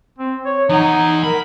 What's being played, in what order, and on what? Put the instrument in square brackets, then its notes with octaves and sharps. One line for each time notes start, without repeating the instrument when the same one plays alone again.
[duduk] C4
C#5
[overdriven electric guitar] E3 F#5 [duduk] D#4
[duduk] A#4 [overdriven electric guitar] B5